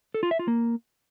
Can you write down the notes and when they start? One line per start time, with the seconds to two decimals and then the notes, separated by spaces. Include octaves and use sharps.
0.14 A4
0.23 F4
0.31 E5
0.39 F4
0.48 A#3